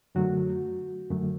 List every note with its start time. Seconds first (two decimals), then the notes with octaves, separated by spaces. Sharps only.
0.15 F#2 D3 F#3 A3 F#4
1.10 F#2 D3 F#3 A3